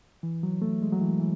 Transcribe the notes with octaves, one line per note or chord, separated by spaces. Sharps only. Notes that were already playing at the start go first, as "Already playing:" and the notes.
E3
F#3
A3
G#3
F#3
E3
E3